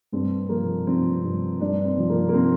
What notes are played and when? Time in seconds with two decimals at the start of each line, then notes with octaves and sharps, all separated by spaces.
0.12 G2 C4
0.49 F3 A#3
0.87 F3 C4
1.23 G2
1.60 G2 D4
1.85 C4
1.98 F3
2.10 A#3
2.29 A#3
2.34 F3 C4